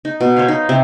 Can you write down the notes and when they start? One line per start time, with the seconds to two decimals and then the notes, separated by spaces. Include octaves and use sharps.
0.05 D#4
0.21 B2
0.36 C5 C#5 F5
0.48 D#4
0.69 C3